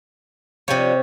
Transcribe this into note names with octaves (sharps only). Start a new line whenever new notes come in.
C3 F3 G3 D4 C#5